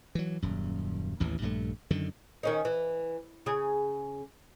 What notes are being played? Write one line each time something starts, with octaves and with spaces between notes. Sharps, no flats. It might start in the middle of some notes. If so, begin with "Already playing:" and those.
E3 F#3
D#1 F#2
A1 D#2 A2 E3
A#1 G2 G3 A3
F#2 D3 D#3
D#3 C#4 D#4
E3
C#3 G#4